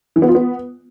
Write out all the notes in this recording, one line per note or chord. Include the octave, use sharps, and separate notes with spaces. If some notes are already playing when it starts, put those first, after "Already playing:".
E3
B3
F4
B3